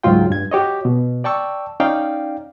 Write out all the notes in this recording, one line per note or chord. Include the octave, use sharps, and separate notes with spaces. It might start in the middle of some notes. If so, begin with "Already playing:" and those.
C#2 G#2 F#3 F4 G5
G2 G#6
F#4 G4 C#5 D#5
B2
D5 G5 A5 C#6 E6
C#4 D#4 D5 F5 G5